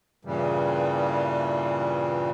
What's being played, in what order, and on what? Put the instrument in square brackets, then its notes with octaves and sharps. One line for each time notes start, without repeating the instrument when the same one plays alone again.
[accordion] G2 A#2 C#3 E3 G3